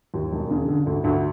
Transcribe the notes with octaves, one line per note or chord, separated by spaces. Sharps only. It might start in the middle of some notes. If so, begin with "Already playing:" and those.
D#2
E1
C#3
D3
D2
D2